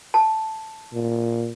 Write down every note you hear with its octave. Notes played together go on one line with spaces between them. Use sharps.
A5
A#2